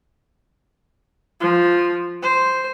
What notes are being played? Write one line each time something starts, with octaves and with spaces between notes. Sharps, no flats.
F3
C5